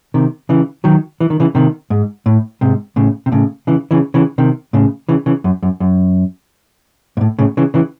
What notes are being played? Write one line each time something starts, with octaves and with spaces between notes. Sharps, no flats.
C3 D#3
C#3 E3
D#3 F#3
E3
D#3
C#3 E3
C3 D#3
G#2
A2
G#2 C3
A2 C#3
C3
A2 C#3
C#3 E3
C#3 E3
C#3 E3
C3 D#3
A2 C#3
C#3 E3
C#3 E3
F#2
F#2
F#2
G#2
A2
A2 C#3
C#3 E3
C#3 E3